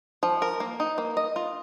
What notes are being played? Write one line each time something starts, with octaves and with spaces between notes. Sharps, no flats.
F3
A#4
A#3
D#4
A#3
D#5
F4